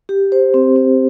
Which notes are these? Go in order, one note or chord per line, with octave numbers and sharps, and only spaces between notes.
G4
C5
C4
C4